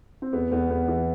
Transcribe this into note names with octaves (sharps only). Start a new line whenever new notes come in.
C4
E2 B3
E2 B3
E2 B3
E3